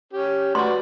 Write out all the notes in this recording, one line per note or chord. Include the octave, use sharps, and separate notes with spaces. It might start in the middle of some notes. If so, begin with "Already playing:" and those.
C#4 G4
F#4 B4 D5 C6